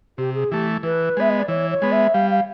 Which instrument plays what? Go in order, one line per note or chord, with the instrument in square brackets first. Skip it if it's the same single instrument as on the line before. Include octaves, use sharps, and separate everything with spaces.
[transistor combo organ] C3 [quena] G4
[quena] G#4
[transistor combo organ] E3 A3 [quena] G4
[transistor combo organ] E3 [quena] B4
[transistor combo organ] G#3 B3 [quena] E5
[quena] D#5
D5
[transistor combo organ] E3 [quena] C#5
[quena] C#5
[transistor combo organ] G#3 B3
[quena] E5
[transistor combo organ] G3 [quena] F5
[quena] F5